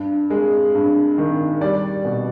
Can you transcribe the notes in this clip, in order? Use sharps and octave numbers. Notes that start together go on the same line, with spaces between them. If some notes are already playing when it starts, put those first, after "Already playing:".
Already playing: G2
G#3
G2
D#3
G3 D5
B2